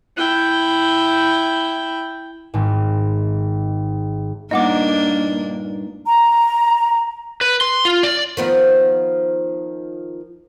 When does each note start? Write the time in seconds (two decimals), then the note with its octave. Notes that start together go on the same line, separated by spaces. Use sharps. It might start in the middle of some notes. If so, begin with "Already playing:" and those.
0.17 E4 G5
2.54 G#1 G#2
4.51 G2 A#2 A#3 D4 D#4 D#5 F#5 D6
6.06 A#5
7.41 B4
7.61 C6
7.85 F4
8.03 D5
8.37 D#3 F3 B3